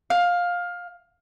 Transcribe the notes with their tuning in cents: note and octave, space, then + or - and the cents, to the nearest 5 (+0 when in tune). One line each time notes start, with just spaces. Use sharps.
F5 +15